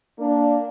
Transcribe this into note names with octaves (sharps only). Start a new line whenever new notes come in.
A#3 D4